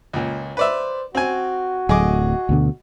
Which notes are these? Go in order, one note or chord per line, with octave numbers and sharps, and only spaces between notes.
C#2 A#2
B4 C5 D5 E5
C4 F#4 G#5
D1 F#3 A3 G#4 D#5 D6
D2 B2 D3